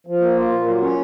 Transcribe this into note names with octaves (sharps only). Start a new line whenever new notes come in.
F3
A#3
F4
A#2
F#3
C#4